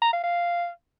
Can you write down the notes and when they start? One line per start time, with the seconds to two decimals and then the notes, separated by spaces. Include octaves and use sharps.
0.02 A#5
0.12 F5
0.23 F5